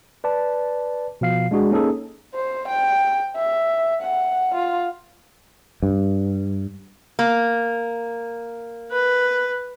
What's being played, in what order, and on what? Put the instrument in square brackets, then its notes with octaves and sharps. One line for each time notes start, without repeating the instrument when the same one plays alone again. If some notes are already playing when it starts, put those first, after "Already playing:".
[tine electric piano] B4 D5 A5
B2 F3 F5 C7
G#3 D4 F#4 G#4
A#3 C#4 D#4 G#4 A4
[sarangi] C5
G5
E5
F#5
F4
[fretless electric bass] G2
[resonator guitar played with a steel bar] A#3
[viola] B4